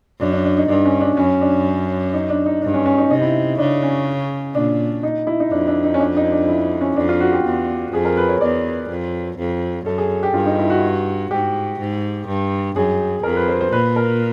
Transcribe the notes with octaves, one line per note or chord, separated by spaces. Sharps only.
F#2 D4
D4
D4
D#4
G2 D4
C#4
D4
F#2 C#4
D4
D#4
D4
D#4
G2 D4
C#4
C#4
D#4
C3 D#4
E4
C#3 D4
C#4
A#2 D4
D#4
E4
D#4
F2 D4
D4
D#4
C#4
D4
D#4
D4
E4
C#4
F2 D4
F4
F#4
G4
E2
F2 G#4
A#4
B4
C#5
E2 D5
F2
F2
F#2 A4
G#4
G4
G2 F4
D#4
E4
F#4
G#2 G4
G#2
G2
F#2 G#4
F2 A#4
B4
C5
C5
A#2 B4
A#4